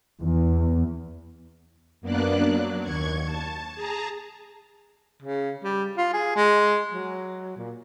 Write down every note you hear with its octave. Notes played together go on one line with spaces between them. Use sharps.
E2
F#2 A#3 B3 D4 D5 F#6
F#3
D#2 C#6 G#6
A5
G#4 A5 A#5
C#3
G3
F4
G#4
G#3
F#3
A#2